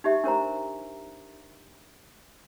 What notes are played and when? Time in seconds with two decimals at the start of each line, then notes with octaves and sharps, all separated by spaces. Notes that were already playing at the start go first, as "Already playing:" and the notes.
0.04 D#4 G4 E5
0.24 D4 A#4 C5 A#5